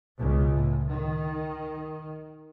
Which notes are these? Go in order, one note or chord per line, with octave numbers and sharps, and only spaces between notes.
C#2 B2
A2
D#3